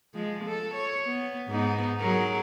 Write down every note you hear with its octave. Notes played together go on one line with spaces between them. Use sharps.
F3 G#3
A4
C#5
B3
G#2 B3 D#4
F#3 G#4 A#4